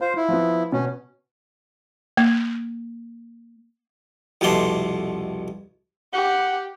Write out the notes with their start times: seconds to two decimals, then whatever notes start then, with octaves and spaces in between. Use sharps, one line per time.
0.01 F4 C5
0.17 E4
0.28 F3 B3
0.72 B2 C#4
2.17 A#3
4.41 C2 F2 B2 A3 C6 D6
6.14 G4 F#5